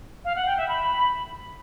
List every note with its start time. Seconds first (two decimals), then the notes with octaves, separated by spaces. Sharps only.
0.24 F5
0.35 F#5
0.46 G5
0.57 E5
0.68 B5